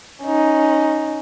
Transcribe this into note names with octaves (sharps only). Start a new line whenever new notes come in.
C#4 D#4